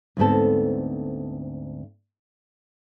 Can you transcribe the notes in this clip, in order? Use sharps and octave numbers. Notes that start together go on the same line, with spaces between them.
D2 G#2 B3 C4 A4